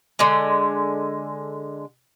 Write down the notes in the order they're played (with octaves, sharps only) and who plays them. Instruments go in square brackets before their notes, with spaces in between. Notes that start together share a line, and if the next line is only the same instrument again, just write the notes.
[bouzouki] D3 G#3